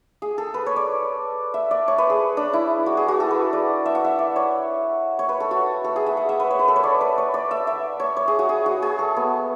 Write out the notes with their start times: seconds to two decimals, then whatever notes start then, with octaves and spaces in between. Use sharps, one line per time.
0.22 G#4
0.38 A4
0.54 B4
0.66 C#5
0.76 D5
1.54 E5
1.71 D5
1.88 C#5
1.98 B4
2.10 G#4
2.37 D4
2.53 E4
2.86 F#4
2.97 G#4
3.08 F#4
3.20 A4
3.31 B4
3.53 D5
3.86 E5
3.95 F#5
4.05 E5
4.19 D5
4.36 C#5
5.19 C#5
5.29 B4
5.40 A4
5.51 F#4
5.84 A4
5.96 G#4
6.06 E5
6.17 F#5
6.29 E5
6.40 B4
6.51 C#5
6.59 B4
6.68 A4
6.76 C#5
6.83 D5
7.01 B4
7.18 C#5
7.34 D5
7.51 E5
7.67 E5
8.00 C#5
8.17 C#5
8.28 G#4
8.39 F#4
8.49 G#4
8.66 F#4
8.82 G#4
8.99 A4
9.16 B3